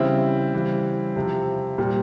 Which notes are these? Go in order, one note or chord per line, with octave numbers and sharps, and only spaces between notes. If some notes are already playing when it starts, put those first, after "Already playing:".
Already playing: C#3 E3 G3 C4 E4
C#3 E3 G3
C3 F3
A#2 G3